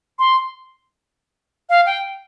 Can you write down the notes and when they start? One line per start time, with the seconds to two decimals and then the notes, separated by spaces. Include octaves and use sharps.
0.19 C6
1.69 F5
1.86 G5